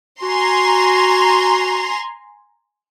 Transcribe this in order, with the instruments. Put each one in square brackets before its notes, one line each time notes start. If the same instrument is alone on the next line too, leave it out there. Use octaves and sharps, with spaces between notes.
[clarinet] F#4 [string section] G#5 A#5 C6